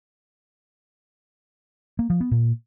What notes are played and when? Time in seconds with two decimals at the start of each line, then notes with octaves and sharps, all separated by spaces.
1.99 A#3
2.10 F3
2.20 B3
2.31 A#2